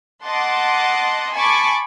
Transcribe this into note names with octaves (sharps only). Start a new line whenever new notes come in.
D#5 F#5 A5 C6 D6
G#5 A5 B5 C#6 D6